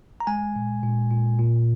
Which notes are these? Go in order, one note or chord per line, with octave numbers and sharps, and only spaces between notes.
A#5
G#3 G#5
A#2
A#2
A#2
A#2